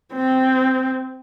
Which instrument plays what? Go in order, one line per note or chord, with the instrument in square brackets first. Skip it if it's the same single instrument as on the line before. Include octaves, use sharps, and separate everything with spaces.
[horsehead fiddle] C4